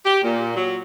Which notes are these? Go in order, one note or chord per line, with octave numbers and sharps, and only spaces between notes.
G4
A#2
F#3